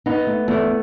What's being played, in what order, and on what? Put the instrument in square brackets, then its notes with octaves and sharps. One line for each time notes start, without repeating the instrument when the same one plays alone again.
[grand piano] B3 [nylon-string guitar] D#4
[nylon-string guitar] A3
[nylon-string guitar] E2 [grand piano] A3